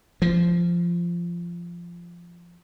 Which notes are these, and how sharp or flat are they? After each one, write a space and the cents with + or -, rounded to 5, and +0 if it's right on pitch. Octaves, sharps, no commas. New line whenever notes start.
F3 -15